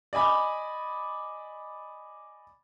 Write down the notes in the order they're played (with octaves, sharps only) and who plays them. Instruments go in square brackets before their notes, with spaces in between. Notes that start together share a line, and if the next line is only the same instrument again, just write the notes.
[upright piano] D5 D#5 G#5 B5 D6